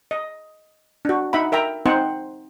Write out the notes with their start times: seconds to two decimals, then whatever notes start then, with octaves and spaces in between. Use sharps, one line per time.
0.11 D#5
1.05 D4 F#4
1.33 D#4 E5 F#5 B5
1.52 A#4 E5 G5 A#5
1.86 C4 D#4 C5 F#5